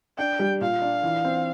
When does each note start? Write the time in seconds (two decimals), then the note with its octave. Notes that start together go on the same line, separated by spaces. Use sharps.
0.18 D4 G5
0.39 G3
0.61 A#2 F5
0.81 D4
1.03 E3
1.25 C4